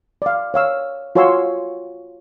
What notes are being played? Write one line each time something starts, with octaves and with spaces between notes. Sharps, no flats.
D5 F5
C#5 F5 E6
F4 F#4 C#5 G#5 C6 E6